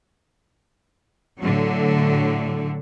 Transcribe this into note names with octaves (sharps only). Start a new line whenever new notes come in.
A2 D3 F#3